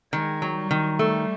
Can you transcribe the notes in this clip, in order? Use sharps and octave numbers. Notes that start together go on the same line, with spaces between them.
D#3 G#3
F#3
G3
D#3
G3 A3